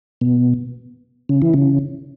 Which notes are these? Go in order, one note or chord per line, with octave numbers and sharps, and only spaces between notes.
B2
C#3
E3
C#3